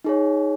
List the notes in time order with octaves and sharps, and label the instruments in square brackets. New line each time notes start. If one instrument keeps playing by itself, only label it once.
[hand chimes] D#4 G#4 C#5